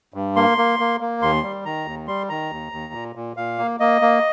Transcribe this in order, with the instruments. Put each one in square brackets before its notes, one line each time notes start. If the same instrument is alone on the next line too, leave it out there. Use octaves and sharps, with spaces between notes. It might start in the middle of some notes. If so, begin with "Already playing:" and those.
[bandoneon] G2
A#3 C6
A#3
A#3
A#3
D#2 C6
G3
D#3 A#5
D#2
G3 C6
D#3 A#5
D#2
D#2
A#2
A#2
A#2 F5
A#3
A#3 D#5
A#3